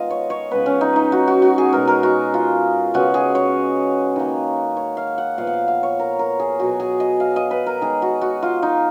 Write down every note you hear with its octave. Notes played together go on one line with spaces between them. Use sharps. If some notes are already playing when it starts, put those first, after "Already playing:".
Already playing: D#3 G#3 B3 F4 D#5 F5
C#5
C#5
C#3 G#3 B3 B4
C#4
D#4
D#4
F#4
F#4
F#4
G#4
B2 G#3 B3 A#4
A#4
F#4
F4
C#3 G#3 B3 F#4
G#4
C#5
D#3 A#3
C#5
F5
F#5
A#2 F3 B3 F5
F#5
F5
F5
C#5
A#4
A#4
G#4
B2 F#3 B3 F#4
G#4
D#5
F5
D#5
B4
A#4
D#3 G#3 B3 G#4
F#4
F#4
F4
D#4